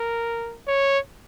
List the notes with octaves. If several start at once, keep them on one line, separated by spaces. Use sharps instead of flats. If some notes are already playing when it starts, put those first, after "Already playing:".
Already playing: A#4
C#5